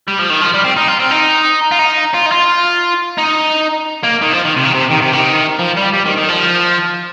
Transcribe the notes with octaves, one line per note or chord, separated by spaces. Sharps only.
G3
F3
D#3
F3
G3
C4
D#4
F4
C4
D#4
F4
D#4
F4
D#4
F4
D#4
A#3
D#3
F3
D#3
C3
D#3
C3
D#3
C3
D#3
F3
G3
G3
D#3
D#3
F3